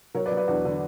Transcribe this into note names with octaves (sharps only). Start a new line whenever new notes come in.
F#3 A#4 C#5
B4 D5
F#3
B4 D5
E2 D4 F#4
D3